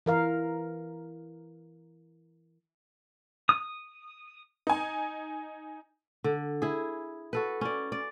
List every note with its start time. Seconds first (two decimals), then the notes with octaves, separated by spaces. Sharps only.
0.06 E3 A#4 F5
3.49 D#6
4.67 D#4 G#5
6.24 D3
6.62 E4 G#4
7.33 F#4 A4 B4
7.61 C#4 D5
7.92 D5